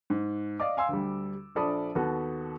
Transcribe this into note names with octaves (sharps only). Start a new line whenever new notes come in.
G#2
D5 D#5 F5 D6
F5 G#5 C6 E6
D2 G3
A#1 F3 A4 D5 B5 D#6
D#2 B3 F#4 A4